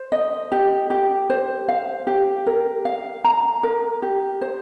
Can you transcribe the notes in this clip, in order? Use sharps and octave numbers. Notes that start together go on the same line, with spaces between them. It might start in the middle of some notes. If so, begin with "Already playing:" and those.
Already playing: C5
D#5
G4
G4
C5
F5
G4
A#4
F5
A#5
A#4
G4
C5